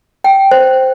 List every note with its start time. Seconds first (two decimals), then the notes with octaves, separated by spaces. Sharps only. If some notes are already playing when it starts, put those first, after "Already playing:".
0.24 G5
0.51 C5